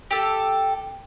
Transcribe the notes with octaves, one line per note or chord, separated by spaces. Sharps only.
G4 A4